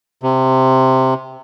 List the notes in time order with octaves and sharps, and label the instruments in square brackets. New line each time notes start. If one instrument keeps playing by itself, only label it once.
[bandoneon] C3